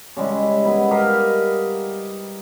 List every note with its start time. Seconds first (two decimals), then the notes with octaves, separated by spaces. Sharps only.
0.17 C#3 G3 G#3 E4
0.65 B3 E4 B4
0.91 G4 A#4 D#5 F5